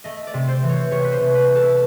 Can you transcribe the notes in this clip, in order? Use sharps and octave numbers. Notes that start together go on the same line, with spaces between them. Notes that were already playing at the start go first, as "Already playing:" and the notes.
A3 D#5
D5
C3
C5
E3
C#5
C3 C#5
B4
C5
C3
B4
A3
A4